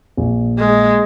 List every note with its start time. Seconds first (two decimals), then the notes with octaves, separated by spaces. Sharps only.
0.17 A#1
0.59 G#3